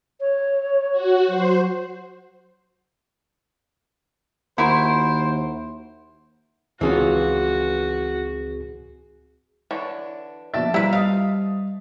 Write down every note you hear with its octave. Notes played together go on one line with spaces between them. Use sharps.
C#5
F#4
F#3 C5
D#2 E4 F#4 A#4 C5
C#2 E3 C4 C#4 F4 F#4 G#4
D3 E3 D4 C#5
A#1 B2 A4 D5 E5 A6
F3 G3 E4 F4 B4 E5 A#5
D#5 F5 D#6